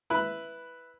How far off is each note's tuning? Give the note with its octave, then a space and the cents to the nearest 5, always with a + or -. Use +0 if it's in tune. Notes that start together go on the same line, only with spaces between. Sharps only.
E4 +0 B4 +0